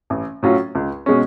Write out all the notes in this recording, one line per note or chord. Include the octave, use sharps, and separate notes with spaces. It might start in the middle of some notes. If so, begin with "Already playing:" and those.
A1
A2 F#3 C#4 F4
C#2
B2 G#3 C#4